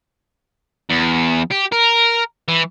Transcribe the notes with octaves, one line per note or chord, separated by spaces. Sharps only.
E2
G4
A#4
E3